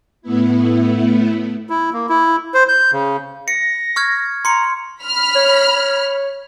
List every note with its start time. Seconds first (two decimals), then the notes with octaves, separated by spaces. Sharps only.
0.22 A2 A3 B3 E4
1.70 E4
1.93 A#3
2.09 E4
2.54 C5
2.69 G6
2.92 C#3
3.48 A#6 C#7
3.96 C#6 F6 G#6
4.45 A#5 C6 C#7
5.03 B5 F6
5.35 C#5
5.76 C#5